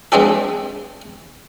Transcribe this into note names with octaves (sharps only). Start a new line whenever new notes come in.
G#3 B3 C4 D4 G4 A4